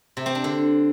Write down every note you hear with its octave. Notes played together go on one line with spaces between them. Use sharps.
C3
C4
D4
D3